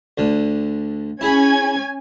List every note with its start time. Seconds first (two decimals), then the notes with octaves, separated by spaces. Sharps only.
0.18 D2 D3
1.21 C#4 E4 G#4 G#5 B5 G#6